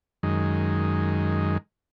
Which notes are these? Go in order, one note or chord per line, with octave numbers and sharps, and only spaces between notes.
F#2 D#3 G#3